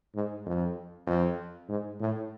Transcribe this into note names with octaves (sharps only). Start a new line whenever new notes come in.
G#2
F2
F2
G#2
A2